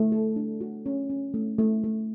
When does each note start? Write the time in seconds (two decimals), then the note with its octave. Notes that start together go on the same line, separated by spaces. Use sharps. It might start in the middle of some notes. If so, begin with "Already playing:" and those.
Already playing: A3
0.12 A4
0.36 D4
0.61 F#4
0.86 C#4
1.10 C#4
1.34 A3
1.58 A3
1.84 A3